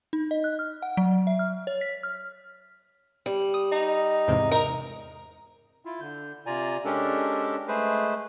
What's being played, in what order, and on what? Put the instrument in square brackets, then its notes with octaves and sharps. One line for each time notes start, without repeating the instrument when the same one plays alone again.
[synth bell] D#4
D#5
F#6
F6
F#5
F#3
E5
F6
C#5
B6
F6
[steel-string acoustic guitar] G3
[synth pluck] D#6
[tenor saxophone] D#4
[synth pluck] E2 G#2 C3
[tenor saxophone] D#4 [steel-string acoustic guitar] A#4 A#5
[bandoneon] E4 F4
D3 G6
C3 F4 D5 G#5 A#5
G#3 C#4 D4 G4 A4 A#4
G#3 A3 G#4 B4 C5